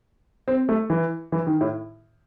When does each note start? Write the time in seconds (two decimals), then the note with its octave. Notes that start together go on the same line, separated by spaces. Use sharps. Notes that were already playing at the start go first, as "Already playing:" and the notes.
0.48 C4
0.69 A3
0.90 E3
1.32 E3
1.47 D#3
1.61 A2